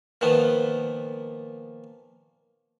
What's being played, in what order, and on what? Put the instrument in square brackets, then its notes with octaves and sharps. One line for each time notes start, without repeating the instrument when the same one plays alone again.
[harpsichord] A#2 D#3 F3 B3